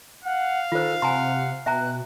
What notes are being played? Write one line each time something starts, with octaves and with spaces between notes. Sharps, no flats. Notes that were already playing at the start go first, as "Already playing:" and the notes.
F5 F#5
D#3 F4 A4 C5
C3 F#5 G#5 A#5 C6
B2 E5 G5 A#5 F#6